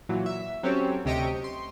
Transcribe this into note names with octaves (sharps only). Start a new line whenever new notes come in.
A#2 E3 F#3
E5
F#3 C4 C#4 G4 A4 C#5
D2 C3 G4 D#5 C#6 D7
C6